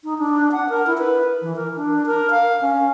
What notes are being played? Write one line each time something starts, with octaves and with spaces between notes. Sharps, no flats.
D#4
D4
F#5
A#4
E4
B4
E3
A#4
D4
A#4
F5
C#4